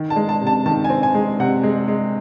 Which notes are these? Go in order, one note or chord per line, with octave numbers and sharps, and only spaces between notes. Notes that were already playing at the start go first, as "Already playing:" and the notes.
Already playing: D#3
A5
G#3
A5
C3
A5
D#3 A5
G#5
C4
G#5
G#3
C3 F#5
G#3
G#3